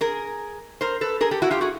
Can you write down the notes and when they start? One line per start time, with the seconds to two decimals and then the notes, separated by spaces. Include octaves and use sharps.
0.01 G#4 A#4
0.81 A#4 C5
1.01 A4 B4
1.21 G#4 A#4
1.31 G4 A4
1.42 E4 F#4
1.51 F4 G4
1.61 F#4 G#4